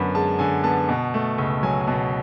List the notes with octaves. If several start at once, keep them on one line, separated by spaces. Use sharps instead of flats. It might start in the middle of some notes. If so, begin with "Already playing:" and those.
Already playing: F#2 D3 B3 B5
G#3 A5
D3 G#5
B3 A5
B2
A3
C#2
F#3 G#5
G#5
B2 A5